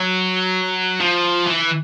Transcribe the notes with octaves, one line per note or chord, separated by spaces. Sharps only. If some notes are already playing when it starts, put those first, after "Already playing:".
Already playing: F#3
F3
E3